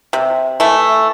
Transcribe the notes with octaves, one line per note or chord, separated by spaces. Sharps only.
C3
E3 A3